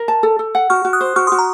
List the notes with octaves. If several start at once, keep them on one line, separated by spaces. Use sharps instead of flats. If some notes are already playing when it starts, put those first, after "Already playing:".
Already playing: A#4
A5
A4
A4
F#5
F#4 C#6 F6
F#4
D#6 F#6
C5
F#4 C#6 F6
C6 D#6
F#4
A#5